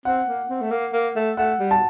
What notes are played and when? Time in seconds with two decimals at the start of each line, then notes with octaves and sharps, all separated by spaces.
0.05 C4 F#5
0.27 A#3
0.49 C4
0.61 A3
0.71 A#3
0.93 A#3
1.16 A3
1.37 A3 F#5
1.59 G3
1.71 A5